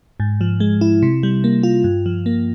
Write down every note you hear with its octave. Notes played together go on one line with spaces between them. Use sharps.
G#2
F3
G#3
E4
C3
G3
A#3
F4
G2
F3
A#3